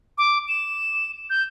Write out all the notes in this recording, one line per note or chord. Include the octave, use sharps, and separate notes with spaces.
D6
E7
G6